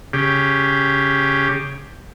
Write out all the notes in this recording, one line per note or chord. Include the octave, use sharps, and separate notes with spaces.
C#3 G4